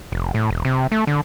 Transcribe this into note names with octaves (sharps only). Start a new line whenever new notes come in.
F1
A2
E1
C3
A3
D3